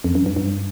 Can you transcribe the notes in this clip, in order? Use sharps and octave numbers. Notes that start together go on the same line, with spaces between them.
F2
F#2
G2
G2